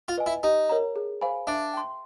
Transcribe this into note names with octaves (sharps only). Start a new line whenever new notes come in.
F4
B4 D#5 G#5
E4
D#4 G4
A#4 C#5 F#5 A#5
G#4
C5 F5 G#5 B5
D4 E5
G5 C6